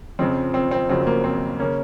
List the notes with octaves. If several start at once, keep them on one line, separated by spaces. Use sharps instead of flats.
F2 C#3 F3 C4
C4
C4
F#1 F2 C#3 F#3 C4
A#3
C4
C#3 A#3 C#4